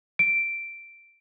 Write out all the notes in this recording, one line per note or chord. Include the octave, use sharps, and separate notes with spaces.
D7